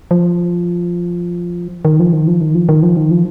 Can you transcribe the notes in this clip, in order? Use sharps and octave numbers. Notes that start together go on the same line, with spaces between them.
F3
D#3
F3
D#3
F3
D#3
F3
D#3
F3
D#3
F3